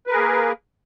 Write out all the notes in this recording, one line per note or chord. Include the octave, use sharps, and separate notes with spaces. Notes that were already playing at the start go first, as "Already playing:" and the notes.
A#3 G#4 A#4 B4